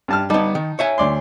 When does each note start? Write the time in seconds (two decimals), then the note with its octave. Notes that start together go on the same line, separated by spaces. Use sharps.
0.08 G2 A5 F6
0.30 G3 B3 D#4 A5
0.55 D#3
0.79 C#5 E5 G#5
0.98 D2 D5 C6